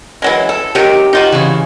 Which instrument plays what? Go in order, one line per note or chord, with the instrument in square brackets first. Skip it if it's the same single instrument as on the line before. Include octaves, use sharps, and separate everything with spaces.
[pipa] E3 F#3 G#3
A4
[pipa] C3 D#3 F#3 [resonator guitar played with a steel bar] G4
[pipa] D#4 F4 F#4
[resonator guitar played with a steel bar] C#3 E3